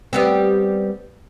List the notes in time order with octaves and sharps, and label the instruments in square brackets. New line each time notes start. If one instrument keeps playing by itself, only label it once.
[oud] G3 B3 C4